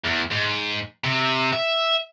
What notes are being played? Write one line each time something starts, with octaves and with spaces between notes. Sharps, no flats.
E2
G#2
C3
E5